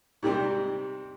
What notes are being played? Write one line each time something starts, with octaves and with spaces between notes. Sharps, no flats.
G#2 C3 G3 C4